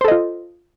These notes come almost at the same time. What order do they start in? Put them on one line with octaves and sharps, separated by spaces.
C5 A4 D#5 F4